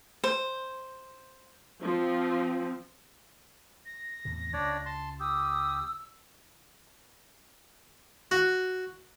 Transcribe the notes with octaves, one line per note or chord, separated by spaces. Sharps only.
C5
F3 C4
A#6
E2 A2 C3
C#2 D4 C#5 D5
A5 C6
G4 D#6 E6
F#4